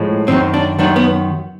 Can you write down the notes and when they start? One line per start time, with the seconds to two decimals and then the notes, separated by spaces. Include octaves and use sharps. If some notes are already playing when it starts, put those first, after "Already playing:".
Already playing: A2 F3 G#3
0.27 F#2 D#3 F#3 C4
0.54 D4
0.78 F#2 D#3 F#3 D4
0.96 B3